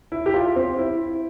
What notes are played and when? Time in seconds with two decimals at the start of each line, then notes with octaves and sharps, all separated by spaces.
0.12 E4
0.26 G4
0.34 F4
0.56 C4
0.79 E4